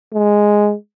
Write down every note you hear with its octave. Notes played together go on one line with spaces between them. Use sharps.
G#3